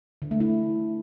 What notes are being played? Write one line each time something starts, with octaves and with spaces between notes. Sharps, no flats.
D3
A3
E4